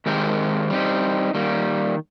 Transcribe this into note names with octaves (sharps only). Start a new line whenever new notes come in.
D#3 G#3 C4 G4 A#4
G3 C4 D#4
D#3 G3 A#3